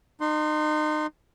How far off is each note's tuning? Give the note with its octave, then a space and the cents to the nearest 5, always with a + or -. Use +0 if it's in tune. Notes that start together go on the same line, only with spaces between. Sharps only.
D#4 -30 C6 +0